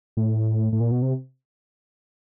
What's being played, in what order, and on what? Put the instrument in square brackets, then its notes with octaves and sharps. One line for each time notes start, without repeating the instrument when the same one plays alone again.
[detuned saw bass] A2
A2
A#2
B2
C3